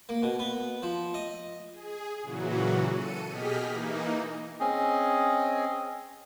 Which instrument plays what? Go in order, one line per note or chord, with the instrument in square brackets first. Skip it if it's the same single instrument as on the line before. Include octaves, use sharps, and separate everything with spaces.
[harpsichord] A#3
B2
B3
F3
D#5
[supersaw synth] G#4
A#2 C#3 E3 F#3 F#4
A4 C#7 D#7
B2 G4 G#4 D#5 F6 B6
E3 A#3 D#4
[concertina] C4 C#4 G#4 D#5